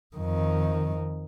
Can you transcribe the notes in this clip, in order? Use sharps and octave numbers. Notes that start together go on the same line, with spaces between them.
F2 D#3